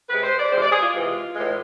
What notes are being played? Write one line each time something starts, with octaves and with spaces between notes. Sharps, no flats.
C3 G#3 B4
C5
D5
C3 E3 G#3 C5
D5
G#4
F4
C3 E3 G#3
A2 E3 G#3